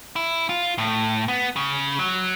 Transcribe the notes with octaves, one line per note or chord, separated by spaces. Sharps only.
E4
F4
A2
B3
C#3
F#3